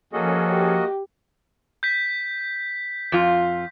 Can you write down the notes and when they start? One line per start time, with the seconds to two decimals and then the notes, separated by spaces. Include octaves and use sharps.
0.13 F3 A#3 C#4 F#4 G#4 A4 D#5
0.50 G4
1.83 G6 B6
3.12 F2 F4